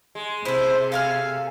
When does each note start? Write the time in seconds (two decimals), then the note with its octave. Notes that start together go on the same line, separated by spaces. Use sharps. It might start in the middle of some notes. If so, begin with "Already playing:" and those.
0.15 G#3
0.45 C3 E4 A4 C5
0.92 A4 F5 G#5 F6